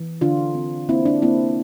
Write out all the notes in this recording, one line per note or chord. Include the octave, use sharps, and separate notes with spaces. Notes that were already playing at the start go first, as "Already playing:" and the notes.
Already playing: E3
D3 D4 F4
C4
A#3 C4 E4
D4
A#3 C4 E4